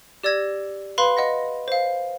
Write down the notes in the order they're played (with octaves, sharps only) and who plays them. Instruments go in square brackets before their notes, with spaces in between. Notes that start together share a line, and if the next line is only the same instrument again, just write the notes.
[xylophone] G4 D5 E6 G#6 A#6
B4 F5 B5 C6
D#5 F#5 A#6
C5 F5